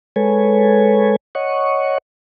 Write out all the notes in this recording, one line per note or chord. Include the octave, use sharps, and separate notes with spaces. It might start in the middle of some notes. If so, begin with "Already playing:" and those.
G#3 A4 B4 C#5 G#5
C#5 D#5 F#5 C#6